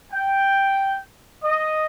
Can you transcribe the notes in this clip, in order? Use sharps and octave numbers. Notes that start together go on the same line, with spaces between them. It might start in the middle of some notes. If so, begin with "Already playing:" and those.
G5
D#5